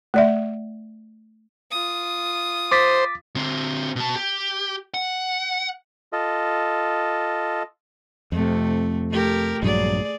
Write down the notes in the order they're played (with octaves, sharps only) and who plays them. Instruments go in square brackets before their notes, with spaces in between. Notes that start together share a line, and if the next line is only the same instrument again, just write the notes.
[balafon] A3 D5 E5
[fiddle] F4 D#6
[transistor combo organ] C5 [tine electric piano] D6 A6 B6
[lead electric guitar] D3 C4
B2 A5
G4
F#5
[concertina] F4 A4 D#5
[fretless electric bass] F2 [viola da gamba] C3 A3
[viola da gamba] A3 G4 A#4
[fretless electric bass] A#1 G2 F#3 [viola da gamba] G#4 D5